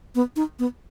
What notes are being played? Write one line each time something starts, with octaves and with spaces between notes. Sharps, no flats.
B3
D#4
B3